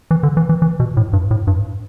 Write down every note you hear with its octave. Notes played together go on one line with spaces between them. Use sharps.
E3
D3
E3
E3
E3
B2
A2
G2
A2
G2